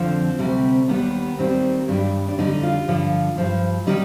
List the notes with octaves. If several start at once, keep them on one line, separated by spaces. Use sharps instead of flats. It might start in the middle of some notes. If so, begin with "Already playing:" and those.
Already playing: F2 D3 F3 C4
D2 C3 G3
D#2 D#3 G3 B3
D#2 D#3 G3 C4
G2 D#3 G3 D4
D4
F2 D3 G3 D#4
F4
G2 D3 F3
G2 F3
D#3 G3 D#4